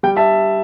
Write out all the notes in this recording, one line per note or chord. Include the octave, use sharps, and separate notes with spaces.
G3 G5
E5 A5